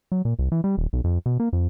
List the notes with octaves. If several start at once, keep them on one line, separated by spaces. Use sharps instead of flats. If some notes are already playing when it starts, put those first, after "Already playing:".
F#3
A#2
C2
E3
G3
D#1
B1
F2
B2
A#3
F2